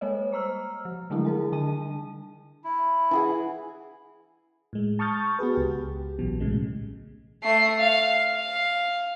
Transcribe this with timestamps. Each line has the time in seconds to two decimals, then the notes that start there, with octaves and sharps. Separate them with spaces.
0.01 G3 G#3 A#3 C#5 D#5
0.32 C5 A#5 E6 F6
0.85 F3
1.10 D3 F#3 G#3 A3 D4 E4
1.25 G#4 A#4 G#5
1.52 D3 G3 D4 A5 D#7
2.64 E4
3.11 E3 G#4 F#5
4.73 A2 G#3
4.99 A5 C#6 D#6 F6 G6 A6
5.39 B3 F#4 G#4 B4
5.54 C#2 G4
6.19 A#1 B2 E3 F#3
6.40 A2 C#3 G#3
7.44 A3 C7
7.80 F5
8.32 F5